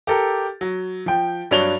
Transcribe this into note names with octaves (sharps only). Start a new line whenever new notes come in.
G4 A4 A#4
F#3
F3 G5
G2 F#3 D4 C#5 F7 G7